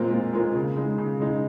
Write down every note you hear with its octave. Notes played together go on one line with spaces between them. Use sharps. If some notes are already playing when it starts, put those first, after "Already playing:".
Already playing: A#2 G#3 C4 F4 A#4
A#2
G#3 C4 F4 A#4
C#3
G#3 D#4
C#3
G#3 D#4